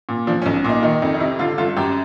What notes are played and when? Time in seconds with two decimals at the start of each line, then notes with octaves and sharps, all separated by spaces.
0.09 A#2
0.27 F3 D4
0.42 C#4
0.46 B1
0.64 A#2 D#4
0.83 D#3 D#4
1.02 F2 D#4
1.14 D#4
1.20 C3 E4
1.39 D3 F4
1.58 G1 F4
1.77 F#2 G4